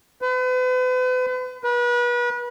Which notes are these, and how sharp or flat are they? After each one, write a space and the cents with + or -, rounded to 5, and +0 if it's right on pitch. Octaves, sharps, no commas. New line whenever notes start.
B4 +40
B4 -35